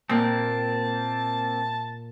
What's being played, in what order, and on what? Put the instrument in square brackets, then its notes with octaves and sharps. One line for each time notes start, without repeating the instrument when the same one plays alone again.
[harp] A#2 [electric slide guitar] A#3 C4 [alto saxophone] A5